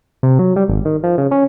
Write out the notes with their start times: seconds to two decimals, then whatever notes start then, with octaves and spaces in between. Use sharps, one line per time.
0.23 C3
0.39 F#3
0.56 G3
0.69 G#1
0.85 D#3
1.03 F3
1.18 C#3
1.31 C#4